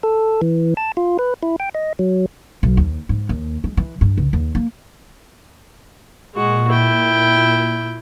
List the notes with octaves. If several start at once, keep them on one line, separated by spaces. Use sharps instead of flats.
A4
E3
A5
F4
B4
E4
G5
D#5
F#3
B1
D#2
G#2
D#2
G#3
E3
G2
C#2
D#2
A#3
A#2 G#3 F#4
E4 G5